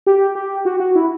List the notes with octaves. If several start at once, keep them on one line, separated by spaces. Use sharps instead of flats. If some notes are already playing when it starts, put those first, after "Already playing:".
G4
G4
F#4
F#4
E4